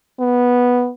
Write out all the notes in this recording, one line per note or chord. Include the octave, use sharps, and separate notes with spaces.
B3